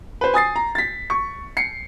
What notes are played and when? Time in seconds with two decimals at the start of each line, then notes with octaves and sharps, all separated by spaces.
0.21 B4 C5
0.34 G#5 D#6 A6 C7
0.56 A#5
0.75 A6 B6
1.10 C#6
1.57 C7 C#7